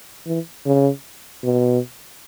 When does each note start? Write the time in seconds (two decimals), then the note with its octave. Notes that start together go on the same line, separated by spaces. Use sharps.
0.27 E3
0.66 C#3
1.44 B2